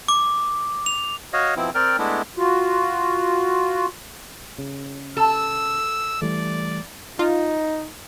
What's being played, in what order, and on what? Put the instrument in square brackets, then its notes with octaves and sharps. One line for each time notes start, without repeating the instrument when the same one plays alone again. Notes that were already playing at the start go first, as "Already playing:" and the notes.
[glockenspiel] D6
F7
[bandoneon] F#4 C#5 D#5 F5
B2 F3 C4 E4
C4 A#4 D5 G5 F6
G#3 A3 B3 D4 E4
[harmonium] F4 F#4
[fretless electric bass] C#3
[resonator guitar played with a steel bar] A4 [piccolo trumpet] E6
[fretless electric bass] E3 G3 A3 [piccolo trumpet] D5
[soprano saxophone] D#4 [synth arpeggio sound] F4